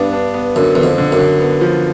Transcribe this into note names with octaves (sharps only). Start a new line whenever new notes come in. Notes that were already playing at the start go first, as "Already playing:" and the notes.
Already playing: G2 B3 D4
D4
B3
F#2 D3
E2 D3
F2
D3
F#2
D3
B3
F3